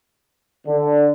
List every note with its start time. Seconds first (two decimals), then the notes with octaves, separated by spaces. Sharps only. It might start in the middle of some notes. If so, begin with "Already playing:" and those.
0.67 D3